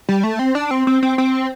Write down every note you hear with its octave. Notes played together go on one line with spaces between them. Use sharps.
G3
A3
C4
D4
C4
C4
C4
C4